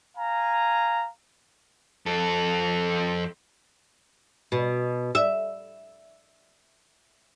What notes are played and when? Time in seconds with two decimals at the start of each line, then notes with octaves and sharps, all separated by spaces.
0.17 F5 G#5 A#5
2.06 F2 A4
4.52 B2
5.15 E5